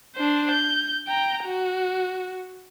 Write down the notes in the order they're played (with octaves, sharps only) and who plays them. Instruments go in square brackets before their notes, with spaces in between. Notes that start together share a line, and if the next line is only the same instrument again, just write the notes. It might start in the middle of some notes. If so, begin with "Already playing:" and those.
[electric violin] D4 C5
G6
G5 A#5
F#4